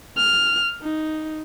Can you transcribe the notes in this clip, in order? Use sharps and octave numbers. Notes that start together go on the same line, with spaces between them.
F6
D#4